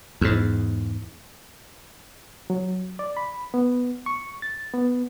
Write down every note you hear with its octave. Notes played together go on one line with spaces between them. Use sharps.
E2 G#2
F#3
D5
B5
B3
C#6
A6
B3